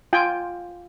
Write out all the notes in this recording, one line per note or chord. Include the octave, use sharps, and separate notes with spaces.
F4 G5 G#5